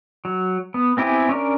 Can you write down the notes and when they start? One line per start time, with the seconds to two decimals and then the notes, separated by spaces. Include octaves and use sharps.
0.25 F#3
0.74 B3
0.97 B3 C4 E4 G4 G#5
1.29 C#4 D4 A#4